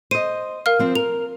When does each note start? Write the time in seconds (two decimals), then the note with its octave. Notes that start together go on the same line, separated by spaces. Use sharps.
0.11 C5 D#5 D#7
0.66 A#4 F5 F6
0.79 F3 C4
0.95 A#4 F7